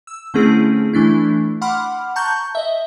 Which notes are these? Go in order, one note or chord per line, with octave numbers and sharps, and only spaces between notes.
E6
D3 A3 C4 C#4 E4 G#4
E3 A3 D4 E4
F#5 B5 C6 D6 F6
A5 A#5 C#6 F#6 G6
D#5 E5